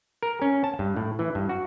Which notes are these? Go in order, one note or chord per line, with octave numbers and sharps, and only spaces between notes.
A#4
C#4
A5
G2
A2
E3
G2
F#4